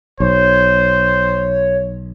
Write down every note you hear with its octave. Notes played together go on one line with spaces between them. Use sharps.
B1 C5 C#5